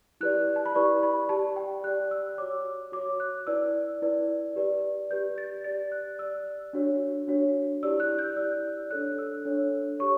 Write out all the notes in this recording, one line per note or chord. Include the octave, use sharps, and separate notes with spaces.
E4 G4 B4 D5 F#6
A5
B5
E4 G4 B4 D5 C#6
B5
G4 D5 A5
G5
G4 D5 F#6
E6
F#4 C#5 D6
F#4 C#5 D6
F#6
E4 B4 D5 E6
E4 B4 D5
G4 B4 D5
G4 B4 D5 G6
A6
G4 D5 A6
F#6
G4 D5 E6
D4 F#4 C#5
D4 F#4 C#5
E4 G4 D5 E6
F#6
G6
E4 G4 D5 E6
D4 A4 C#5 F#6
E6
D4 A4 C#5
G4 C#5 C#6